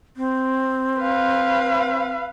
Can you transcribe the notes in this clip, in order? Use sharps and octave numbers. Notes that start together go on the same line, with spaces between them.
C4
B4 F5